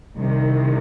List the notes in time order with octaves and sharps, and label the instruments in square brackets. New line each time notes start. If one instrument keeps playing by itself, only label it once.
[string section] C2 C3 D#3